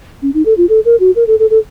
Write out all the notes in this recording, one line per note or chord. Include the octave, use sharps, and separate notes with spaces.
C#4
D#4
A4
F4
A4
A#4
F#4
A#4
A4
A4
A4